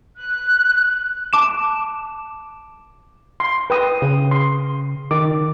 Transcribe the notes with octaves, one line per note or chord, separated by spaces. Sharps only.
F#6
A5 D6 D7 E7
C6
B4 G5 D#6
C#3
C6
D#3 D6